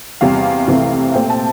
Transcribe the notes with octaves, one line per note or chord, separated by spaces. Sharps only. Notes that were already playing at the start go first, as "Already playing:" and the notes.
E2 C3 G3 F5
C2 C3 E3 A3 C4
A#2 A3 C4 G5
A5